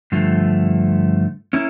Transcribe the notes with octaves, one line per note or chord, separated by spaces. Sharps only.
G2 D3 F3 A3
A#3 C#4 E4